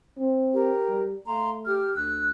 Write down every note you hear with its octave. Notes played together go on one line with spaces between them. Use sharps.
C4
G4 A#4
G3
A3 F5 A#5 C6
G4 F6
D2 E6 F#6